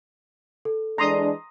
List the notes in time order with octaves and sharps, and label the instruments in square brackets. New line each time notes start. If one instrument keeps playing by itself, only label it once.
[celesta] A4
[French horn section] E3 G#3 D4 [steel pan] A#5 C6 D#6